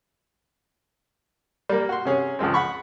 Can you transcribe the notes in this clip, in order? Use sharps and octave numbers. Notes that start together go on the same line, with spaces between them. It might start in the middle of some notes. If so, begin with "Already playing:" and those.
G3 A#3
F#4 C6
C3 C#4 G#4
C#2 F3 G#3 C4
F#5 B5 C#6